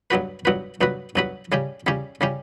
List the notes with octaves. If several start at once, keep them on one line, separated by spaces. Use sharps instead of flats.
G2 F#3 B3 F#4 B4
G2 F#3 B3 F#4 B4
G2 F#3 B3 F#4 B4
G2 F#3 B3 F#4 B4
C#3 G3 C#4 G4
C#3 G3 C#4 G4
C#3 G3 C#4 G4